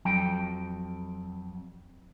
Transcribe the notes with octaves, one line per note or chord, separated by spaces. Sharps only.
F2 F#3 G5